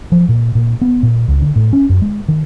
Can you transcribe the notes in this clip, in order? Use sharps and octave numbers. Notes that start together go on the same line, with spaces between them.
F3
A#2
A#2
B3
A#2
C#2
D3
A2
C#4
F#2
G#3
D#3